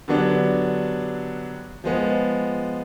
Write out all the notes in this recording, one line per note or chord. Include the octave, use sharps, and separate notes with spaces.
D3 F#3 B3 D4 G4
F3 G#3 B3